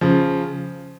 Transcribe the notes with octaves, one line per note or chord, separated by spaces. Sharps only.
C#3 F3